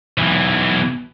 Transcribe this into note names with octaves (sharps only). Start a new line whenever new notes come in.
B1 E3